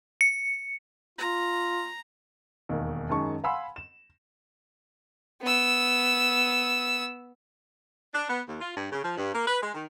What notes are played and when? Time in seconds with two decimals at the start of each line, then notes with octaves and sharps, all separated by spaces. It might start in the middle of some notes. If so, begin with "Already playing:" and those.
0.21 C#7
1.18 F4 A#5
2.69 E1 D#2 D#3
3.09 F#2 D#3 G#3 A5 C#6
3.44 F5 F#5 G#5 B5 C6 E6
3.76 E7
5.42 B3 E6
8.14 D4
8.29 B3
8.48 D#2
8.60 F4
8.77 G2
8.91 C#3
9.04 F3
9.17 G2
9.34 A#3
9.46 B4
9.62 G#3
9.74 D#3